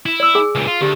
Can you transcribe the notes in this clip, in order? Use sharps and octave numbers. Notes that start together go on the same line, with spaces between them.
E4
D5 E6
G#4 G#5
C#2 A#2
F4
D2 G4